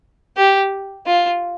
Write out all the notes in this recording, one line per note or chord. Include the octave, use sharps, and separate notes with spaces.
G4
F4